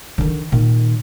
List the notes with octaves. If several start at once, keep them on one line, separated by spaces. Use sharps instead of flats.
D3 D#3
A#2 D#3